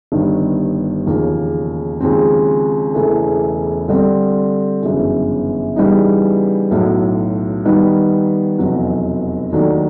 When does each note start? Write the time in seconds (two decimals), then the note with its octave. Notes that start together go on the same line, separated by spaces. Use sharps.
0.12 G1 G2 D#3
1.05 E1 D#2 C#3 F3 A#3
2.00 D#2 C#3 F3 G#3 C4
2.94 E1 E2 C#3 E3 A3
3.88 D3 G3 C4
4.82 G1 F#2 C#3 E3
5.76 C#3 E3 G3 B3 D#4
6.71 B1 A2 F#3
7.65 D#3 G3 B3 D#4
8.59 F1 E2 B2 F#3
9.52 D#2 D#3 F#3 A3 D4